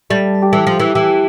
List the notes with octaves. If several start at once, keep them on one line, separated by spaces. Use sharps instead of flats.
G3 A3
G4
E3 A4
F3
A4
E3
E3 G4